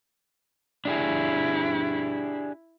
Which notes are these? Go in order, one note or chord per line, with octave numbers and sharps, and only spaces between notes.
D4 E4 G4 G#4